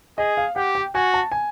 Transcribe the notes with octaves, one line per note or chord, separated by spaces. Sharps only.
G#4 D#5
F5
G4 F#5
G5
F#4 G#5
A5
G#5